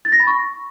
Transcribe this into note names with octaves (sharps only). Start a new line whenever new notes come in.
A6
A#6
B5
C#6